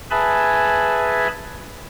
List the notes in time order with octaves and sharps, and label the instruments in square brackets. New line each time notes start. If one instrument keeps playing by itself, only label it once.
[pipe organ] G#4 B4 E5 G#5 A5 B5